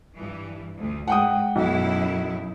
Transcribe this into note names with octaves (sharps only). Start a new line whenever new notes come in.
G2 E3
D2
G#2 F#5 G5 D#6
B1 F#2 E4